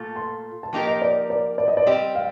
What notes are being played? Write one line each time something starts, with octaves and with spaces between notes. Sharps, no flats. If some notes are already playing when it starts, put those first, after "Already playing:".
Already playing: A#2 A3 F4 A4
C6
A5
F3 A#3 D#4 G4 A#4 G5
D#5
D5
D5
D5
D#5
D5
G3 C4 G4 D#5
F5